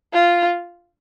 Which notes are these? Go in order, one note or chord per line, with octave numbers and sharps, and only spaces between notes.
F4